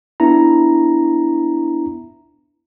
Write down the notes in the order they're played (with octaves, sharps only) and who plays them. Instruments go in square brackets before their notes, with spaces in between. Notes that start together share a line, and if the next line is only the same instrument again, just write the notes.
[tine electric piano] B3 D4 E4 A#5